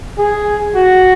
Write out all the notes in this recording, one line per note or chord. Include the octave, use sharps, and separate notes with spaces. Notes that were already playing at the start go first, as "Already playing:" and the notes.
G#4
F#4